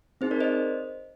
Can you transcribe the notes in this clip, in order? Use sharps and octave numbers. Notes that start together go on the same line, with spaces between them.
C4 D#4 G#4 C5
A#4 D5
C5 D#5